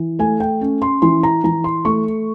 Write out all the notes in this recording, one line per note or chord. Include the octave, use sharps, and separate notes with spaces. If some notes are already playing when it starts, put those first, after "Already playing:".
Already playing: E3
A3 G#5
G5
C#4
C6
E3 C6
A#5
E3 A#5
C6
A3 C#6